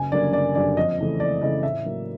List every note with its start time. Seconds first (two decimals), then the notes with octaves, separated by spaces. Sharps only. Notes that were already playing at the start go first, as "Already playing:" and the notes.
Already playing: F#1 G#5
0.12 F#2 D3 G3 A#3 D5
0.33 F#1 D5
0.55 F#2 D3 G3 A#3 D5
0.77 F2 D#5
0.98 C#3 E3 A3
1.20 F2 D5
1.42 C#3 E3 A3 D#5
1.63 A2 E5
1.85 F#3 A#3